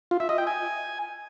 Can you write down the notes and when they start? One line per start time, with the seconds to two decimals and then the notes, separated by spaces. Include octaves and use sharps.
0.11 F4
0.20 E5
0.29 D#5
0.38 G5
0.47 G#5